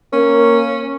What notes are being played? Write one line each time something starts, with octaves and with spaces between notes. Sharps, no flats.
A#3 C#4